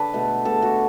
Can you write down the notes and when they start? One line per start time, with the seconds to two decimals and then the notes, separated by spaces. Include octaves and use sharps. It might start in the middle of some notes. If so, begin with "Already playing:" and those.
Already playing: D3 A4 B4 D5
0.13 B2 A3
0.45 B2 A3 A4
0.62 F#4